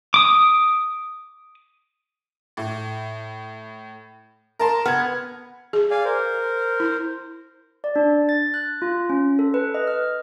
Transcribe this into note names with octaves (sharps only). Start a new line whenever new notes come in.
D6 D#6
A2
A#4 A5 C6
B3 F6 G#6
G#4
D5 F5 G#5
A#4 C5
E4
D5
D4
A6
F#6
F4
C#4
A4
B4
D#5
F6